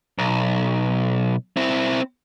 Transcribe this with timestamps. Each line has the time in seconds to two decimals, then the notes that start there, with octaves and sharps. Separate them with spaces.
0.18 B1
1.57 C4 E4